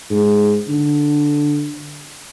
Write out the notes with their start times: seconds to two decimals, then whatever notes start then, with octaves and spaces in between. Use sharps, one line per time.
0.11 G#2
0.68 D3